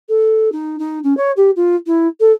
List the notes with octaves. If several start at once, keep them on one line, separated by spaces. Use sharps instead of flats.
A4
D#4
D#4
C#4
C#5
G4
F4
E4
A4